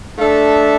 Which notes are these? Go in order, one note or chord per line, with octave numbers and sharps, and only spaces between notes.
A3 D4 A4 E5